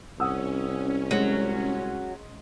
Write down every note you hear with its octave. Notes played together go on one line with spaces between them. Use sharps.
C2 C#4 F#5 D#6 E6
F#3 G#3